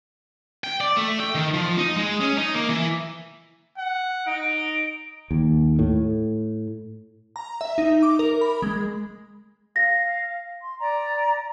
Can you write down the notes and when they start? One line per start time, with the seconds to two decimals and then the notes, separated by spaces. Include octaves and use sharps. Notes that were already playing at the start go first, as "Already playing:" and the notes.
0.64 G5
0.80 D5
0.97 A3
1.20 G5
1.35 D#3
1.54 F3
1.78 D#4
1.97 G#3
2.21 C#4
2.38 D#4
2.55 A#3
2.69 E3
3.78 F#5
4.27 D#4 D7
5.31 D#2
5.79 A2
7.36 A#5
7.61 E5
7.78 D#4
8.03 D6
8.19 A#4
8.41 B5
8.62 G#3
9.76 F5 A#6
10.60 C6
10.79 D5 A#5